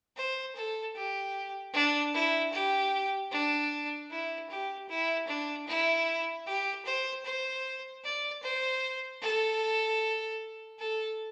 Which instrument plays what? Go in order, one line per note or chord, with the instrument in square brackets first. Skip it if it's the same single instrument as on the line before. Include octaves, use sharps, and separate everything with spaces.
[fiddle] C5
A4
G4
D4
E4
G4
D4
E4
G4
E4
D4
E4
G4
C5
C5
D5
C5
A4
A4